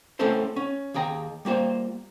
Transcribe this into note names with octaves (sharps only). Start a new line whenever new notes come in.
A3 C4 C#4 E4 A4 C5
C#4
D#2 G#4 G5 A#5
G3 A#3 F4 C5